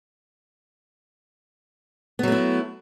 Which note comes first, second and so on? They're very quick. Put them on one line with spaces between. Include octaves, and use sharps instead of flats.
B3 F#3 A3 E4